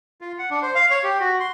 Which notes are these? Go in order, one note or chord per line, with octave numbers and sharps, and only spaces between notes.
F4
F#5
D4
C5
F5
C#5
G4
F#4
C6